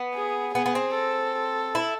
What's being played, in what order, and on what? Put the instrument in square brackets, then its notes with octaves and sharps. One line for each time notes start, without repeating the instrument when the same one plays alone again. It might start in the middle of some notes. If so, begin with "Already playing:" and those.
Already playing: [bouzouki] B3
[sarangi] G#4
[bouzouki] B3 [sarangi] G#4
[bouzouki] B3
C4
[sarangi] A4
[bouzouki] E4